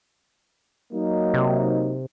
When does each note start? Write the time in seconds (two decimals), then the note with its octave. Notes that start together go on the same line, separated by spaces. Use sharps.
0.93 F#3 A#3 D#4
1.34 C3